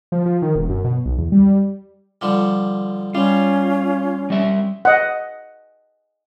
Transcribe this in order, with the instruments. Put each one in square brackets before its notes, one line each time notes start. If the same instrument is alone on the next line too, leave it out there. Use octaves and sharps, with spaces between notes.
[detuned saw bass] F3
F3
D#3
E1
F#2
B2
B1
E2
G3
[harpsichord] D3 F3 G3
[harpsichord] G3 [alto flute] C#4 [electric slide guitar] F4
[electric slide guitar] G3 E5
[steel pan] D#5 F#5